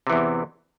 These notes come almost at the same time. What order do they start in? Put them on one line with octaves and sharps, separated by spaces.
C3 E3 E2